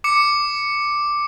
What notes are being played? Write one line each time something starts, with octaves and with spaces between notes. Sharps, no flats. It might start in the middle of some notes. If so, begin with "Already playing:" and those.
D6 C#7